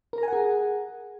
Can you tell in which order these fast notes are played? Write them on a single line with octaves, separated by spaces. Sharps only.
A#4 A#5 G#5 F#5 G#4